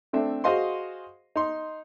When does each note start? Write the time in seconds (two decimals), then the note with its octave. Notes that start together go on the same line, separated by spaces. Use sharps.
0.13 A3 C4 D4 E5
0.44 F#4 G#4 C5 D#5 F5 C6
1.36 D#4 C6